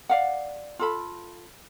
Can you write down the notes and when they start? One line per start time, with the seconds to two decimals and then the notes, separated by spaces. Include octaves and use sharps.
0.09 D5 F5 F#5
0.79 F4 A4 B5